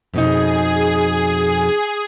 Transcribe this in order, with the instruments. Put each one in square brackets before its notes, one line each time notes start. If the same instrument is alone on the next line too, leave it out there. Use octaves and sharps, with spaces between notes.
[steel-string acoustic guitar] F2 B2 D#4 [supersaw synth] G#4